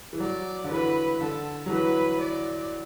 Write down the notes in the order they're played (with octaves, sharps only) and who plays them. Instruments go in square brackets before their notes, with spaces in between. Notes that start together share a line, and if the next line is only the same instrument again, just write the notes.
[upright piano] E3
[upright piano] F#3 [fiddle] D5
[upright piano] D3
[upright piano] E3 [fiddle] B4
[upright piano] D3 [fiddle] A4
[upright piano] F#3
[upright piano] E3 [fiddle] B4
[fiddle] D5